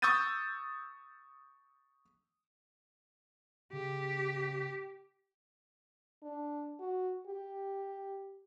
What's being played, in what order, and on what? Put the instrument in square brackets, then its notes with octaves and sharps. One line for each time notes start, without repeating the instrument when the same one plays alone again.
[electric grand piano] C#6 D#6 E6 G6 A6 D#7
[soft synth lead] C#3 [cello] G4
[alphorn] D4
F#4
G4